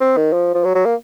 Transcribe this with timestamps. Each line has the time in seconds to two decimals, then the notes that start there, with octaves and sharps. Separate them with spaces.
0.01 C4
0.17 D#3
0.33 F3
0.54 F3
0.64 F#3
0.75 F#3
0.85 A#3